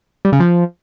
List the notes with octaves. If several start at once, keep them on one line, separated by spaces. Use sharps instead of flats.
G3
C#3
F3